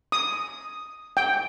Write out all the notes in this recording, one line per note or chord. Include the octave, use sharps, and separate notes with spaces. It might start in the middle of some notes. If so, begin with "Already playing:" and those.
D#6
G5